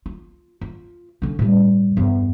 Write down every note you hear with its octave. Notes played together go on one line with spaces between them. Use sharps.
F4
F4
D3 C#4
A2 G3
E2 G2